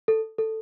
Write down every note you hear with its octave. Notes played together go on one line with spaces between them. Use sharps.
A4
A4